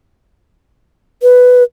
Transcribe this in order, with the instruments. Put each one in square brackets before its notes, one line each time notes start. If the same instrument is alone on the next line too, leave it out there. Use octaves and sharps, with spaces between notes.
[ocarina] B4